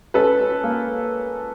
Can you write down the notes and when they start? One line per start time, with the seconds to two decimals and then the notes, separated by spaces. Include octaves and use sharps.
0.14 C#4 A4 B4
0.40 C#4
0.64 A#3